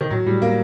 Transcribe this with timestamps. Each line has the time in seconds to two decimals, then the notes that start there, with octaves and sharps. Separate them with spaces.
0.01 D#3
0.10 A2 F#3
0.26 A2 G3
0.42 A2 A#3